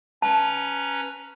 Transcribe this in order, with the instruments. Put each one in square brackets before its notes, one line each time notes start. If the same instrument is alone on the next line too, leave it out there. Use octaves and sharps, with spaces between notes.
[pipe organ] C#4 B4 A#5 [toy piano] A5